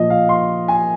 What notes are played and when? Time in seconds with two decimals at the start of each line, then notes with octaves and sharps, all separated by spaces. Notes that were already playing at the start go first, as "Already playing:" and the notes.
Already playing: A#2 F3 D#5
0.10 F5
0.29 C6
0.68 G#5